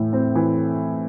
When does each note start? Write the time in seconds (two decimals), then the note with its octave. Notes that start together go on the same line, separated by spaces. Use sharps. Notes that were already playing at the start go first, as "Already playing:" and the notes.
Already playing: A2 E3 A3
0.13 C4
0.35 E3